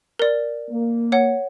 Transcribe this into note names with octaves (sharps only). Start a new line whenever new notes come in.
A#4 D5
A#3
C#5 F#5